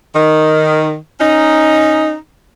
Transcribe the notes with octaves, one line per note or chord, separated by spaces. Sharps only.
D#3
C#4 D#4